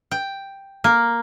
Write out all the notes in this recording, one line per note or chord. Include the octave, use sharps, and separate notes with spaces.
G5
A#3